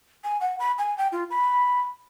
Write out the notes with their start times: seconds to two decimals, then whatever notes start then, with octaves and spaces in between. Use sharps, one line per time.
0.24 G#5
0.41 F#5
0.59 B5
0.78 G#5
0.98 G5
1.12 F4
1.30 B5